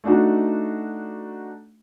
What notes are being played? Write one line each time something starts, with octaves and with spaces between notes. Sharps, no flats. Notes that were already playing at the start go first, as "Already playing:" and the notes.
A3 D4 D#4 F#4